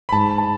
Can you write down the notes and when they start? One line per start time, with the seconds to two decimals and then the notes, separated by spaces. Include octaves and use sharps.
0.09 B5
0.12 G#2 A5
0.38 A5